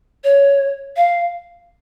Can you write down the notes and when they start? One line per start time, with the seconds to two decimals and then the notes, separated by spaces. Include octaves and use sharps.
0.24 C#5
0.97 F5